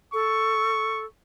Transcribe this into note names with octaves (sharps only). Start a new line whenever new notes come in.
A4 C#6